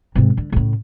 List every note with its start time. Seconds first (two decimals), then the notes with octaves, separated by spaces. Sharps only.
0.15 G#2 C3
0.37 D3
0.52 A2 C#3